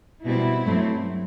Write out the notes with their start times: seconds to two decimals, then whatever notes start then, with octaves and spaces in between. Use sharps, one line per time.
0.24 B2 G3 C4 E4
0.65 G2 F#3 A3 C4